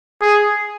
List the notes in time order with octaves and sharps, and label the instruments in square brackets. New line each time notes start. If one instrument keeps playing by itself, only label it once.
[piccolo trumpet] G#4